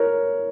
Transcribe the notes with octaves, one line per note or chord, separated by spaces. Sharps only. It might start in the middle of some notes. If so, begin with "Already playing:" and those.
Already playing: A#4 C#5